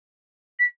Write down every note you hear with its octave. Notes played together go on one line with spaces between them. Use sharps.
B6